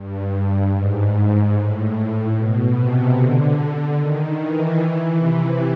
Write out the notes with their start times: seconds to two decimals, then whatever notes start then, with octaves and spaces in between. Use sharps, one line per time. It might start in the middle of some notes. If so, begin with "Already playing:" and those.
Already playing: G2
0.74 G#2
1.14 G#2
1.55 A2
2.35 B2
2.76 C3
3.16 D3
3.97 D#3
4.38 E3
4.78 E3
5.18 C3